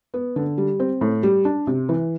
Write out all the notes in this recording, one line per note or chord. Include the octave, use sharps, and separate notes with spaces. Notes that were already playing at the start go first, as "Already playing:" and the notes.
B3
D3
G3
C4
A2
G3
D4
C3
E3